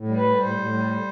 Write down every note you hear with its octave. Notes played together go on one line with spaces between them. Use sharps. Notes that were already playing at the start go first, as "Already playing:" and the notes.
Already playing: A2
G3
B4
G3
A2 C5
A2
G3